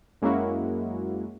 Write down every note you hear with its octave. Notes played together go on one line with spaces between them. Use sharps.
F#2 G#3 A#3 C#4 E4 F#4